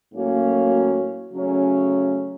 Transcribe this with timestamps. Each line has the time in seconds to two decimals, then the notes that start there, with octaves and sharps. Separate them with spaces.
0.14 A2 F#3 A#3 C#4 F#4
1.33 C#3 F#3 A3 C#4